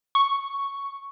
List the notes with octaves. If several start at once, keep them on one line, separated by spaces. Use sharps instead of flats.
C#6